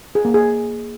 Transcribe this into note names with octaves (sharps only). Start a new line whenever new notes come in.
G#4
A#3
G#4